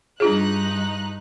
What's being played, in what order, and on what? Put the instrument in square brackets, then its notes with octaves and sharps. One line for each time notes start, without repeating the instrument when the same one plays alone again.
[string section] G2 D#4 F#6 [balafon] D4 F4 G#4